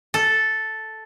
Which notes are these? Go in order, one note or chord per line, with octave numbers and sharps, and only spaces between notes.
A4